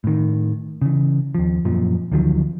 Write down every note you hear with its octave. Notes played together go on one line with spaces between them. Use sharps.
A2 D#3
C#3 E3
D#2 F3
F#2 A#2 F3
D2 D#3 F3 F#3